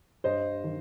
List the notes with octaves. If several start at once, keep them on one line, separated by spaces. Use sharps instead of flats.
G2 C5 D#5
D#3